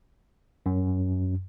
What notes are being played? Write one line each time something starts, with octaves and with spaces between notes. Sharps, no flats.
F#2